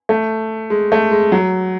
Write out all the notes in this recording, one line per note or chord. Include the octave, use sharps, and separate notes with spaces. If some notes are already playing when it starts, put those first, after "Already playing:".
A3
G#3
A3
G#3
F#3